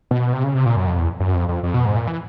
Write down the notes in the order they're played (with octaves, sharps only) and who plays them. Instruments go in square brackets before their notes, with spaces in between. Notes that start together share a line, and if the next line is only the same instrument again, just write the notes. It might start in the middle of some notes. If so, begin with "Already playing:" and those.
[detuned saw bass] B2
C3
C#3
C3
A#2
F#2
F2
E2
F#2
F2
F2
F2
B2
G#2
A#2
E3